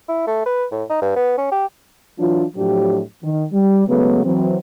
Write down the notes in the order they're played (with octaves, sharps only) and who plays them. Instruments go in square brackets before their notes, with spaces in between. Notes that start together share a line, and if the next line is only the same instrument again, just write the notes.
[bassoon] E4
A3
B4
A2
D#4
G2
B3
C#4
G4
[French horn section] E3 F#3 D4 F4
A2 F3 F#3 D4 G4
D#3
G3
C#3 F#3 G#3 A3 B3
E3 F#3 C4